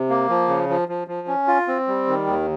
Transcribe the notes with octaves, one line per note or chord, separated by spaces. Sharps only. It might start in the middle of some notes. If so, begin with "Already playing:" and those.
Already playing: C3
A#3
F3
C#3
F3
F3
F3
C#4
F4
C4
G3
D#3
D#2